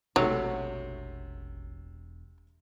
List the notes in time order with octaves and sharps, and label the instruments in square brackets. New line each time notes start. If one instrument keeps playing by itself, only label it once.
[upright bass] E1 [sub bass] A1 [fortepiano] C3 A3 [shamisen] F#3